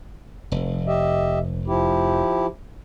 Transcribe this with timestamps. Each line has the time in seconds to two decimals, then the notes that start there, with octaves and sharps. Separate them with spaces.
0.52 F1
0.87 G4 D#5 E5
1.67 F3 E4 G4